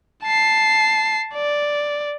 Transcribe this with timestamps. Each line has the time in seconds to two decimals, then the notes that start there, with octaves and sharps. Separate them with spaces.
0.24 A5 C7
1.35 D5